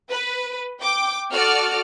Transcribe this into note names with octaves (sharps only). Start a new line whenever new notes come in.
B4
G5 D6
F#4 A4 D5 F6